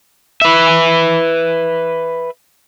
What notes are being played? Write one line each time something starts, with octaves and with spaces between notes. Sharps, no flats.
B4 E5